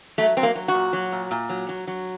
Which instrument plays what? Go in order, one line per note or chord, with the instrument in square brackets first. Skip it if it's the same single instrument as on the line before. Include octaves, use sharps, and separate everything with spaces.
[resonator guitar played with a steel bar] F#3 A3
F#3 C4
A#3
F#3
F#4
A#2
F#3
A#2
A#2
F#3
F#3
F#3